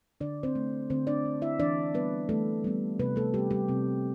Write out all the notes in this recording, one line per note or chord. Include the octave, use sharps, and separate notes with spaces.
D3 D4 D5
C4 C5
A3
D3 C4 C5
D4 D5
A3
E4 E5
E3 D4 D5
G3 B3 B4
E3 A3 A4
G3 B3
C3 B3 B4
A3 A4
G3 B3 G4
G3 G4
C3 C4